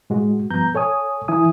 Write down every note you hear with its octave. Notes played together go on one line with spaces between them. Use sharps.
A2 G#3 F#4
G2 F3 B3 A#5 G6
A4 C#5 G#5 D#6
E3 E4 G#5 D#6